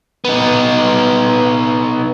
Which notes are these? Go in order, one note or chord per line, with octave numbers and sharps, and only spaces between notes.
B3 D#4